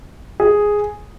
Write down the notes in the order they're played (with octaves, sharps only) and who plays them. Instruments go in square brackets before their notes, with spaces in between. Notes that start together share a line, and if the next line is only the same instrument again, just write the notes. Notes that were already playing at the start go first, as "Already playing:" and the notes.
[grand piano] G#4